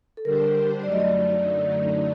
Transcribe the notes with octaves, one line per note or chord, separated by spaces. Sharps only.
A4
D3 G3 D4 G4 A#4 C5
F#2 D3 F#3 A3 D#4 D5
D#5
D5